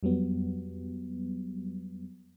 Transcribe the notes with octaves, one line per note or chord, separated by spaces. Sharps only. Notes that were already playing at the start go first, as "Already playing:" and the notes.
F2 F#3 G3 B3